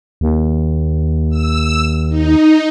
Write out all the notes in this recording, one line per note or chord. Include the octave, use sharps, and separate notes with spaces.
D#2
E6
D#4